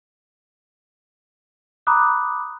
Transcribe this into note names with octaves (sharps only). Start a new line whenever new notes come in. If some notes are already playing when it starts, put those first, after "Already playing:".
A#5 B5 D6 D#6 F#6